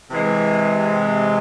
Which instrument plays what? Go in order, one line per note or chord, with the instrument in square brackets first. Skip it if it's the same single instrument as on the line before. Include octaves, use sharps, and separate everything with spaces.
[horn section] C3 E3 G#3